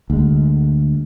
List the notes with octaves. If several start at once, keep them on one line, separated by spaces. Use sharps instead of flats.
D2 G#3